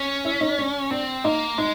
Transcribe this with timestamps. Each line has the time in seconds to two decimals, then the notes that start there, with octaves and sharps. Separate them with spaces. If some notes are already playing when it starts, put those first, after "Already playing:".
Already playing: C#4
0.25 E4 E5
0.41 D#4 D#5
0.57 D4 D5
0.91 C4 D4 D5
1.24 A#3 D#4 D#5
1.58 G#3 D#4 D#5